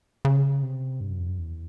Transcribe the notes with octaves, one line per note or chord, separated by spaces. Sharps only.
C#3
C3
G2
F#2
F2
F#2
E2